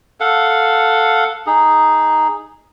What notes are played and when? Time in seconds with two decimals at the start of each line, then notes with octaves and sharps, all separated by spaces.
0.20 A4 F5 F#5
1.47 D#4 G#4